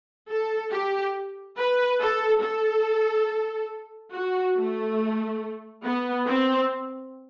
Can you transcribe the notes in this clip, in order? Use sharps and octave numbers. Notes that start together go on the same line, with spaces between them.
A4
G4
B4
A4
A4
F#4
A3
B3
C4